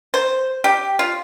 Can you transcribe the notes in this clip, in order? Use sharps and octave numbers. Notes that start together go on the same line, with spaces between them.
C5
G4
F4